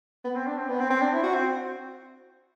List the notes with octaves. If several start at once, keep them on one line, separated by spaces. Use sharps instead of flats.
B3
C4
D4
C4
B3
C4
C4
D4
E4
F#4
C4